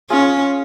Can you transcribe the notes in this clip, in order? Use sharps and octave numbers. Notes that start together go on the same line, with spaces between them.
C#4 F4 G#4